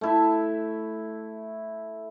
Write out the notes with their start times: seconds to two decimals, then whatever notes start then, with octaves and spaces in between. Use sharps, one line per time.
0.01 A3 E4 E5